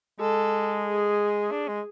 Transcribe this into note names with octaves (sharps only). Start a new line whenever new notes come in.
G#3 A4
G#4
D4
G#3